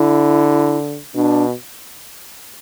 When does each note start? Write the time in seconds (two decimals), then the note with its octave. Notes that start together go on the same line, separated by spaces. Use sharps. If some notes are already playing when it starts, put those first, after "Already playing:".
Already playing: D3 E4
1.15 B2 D4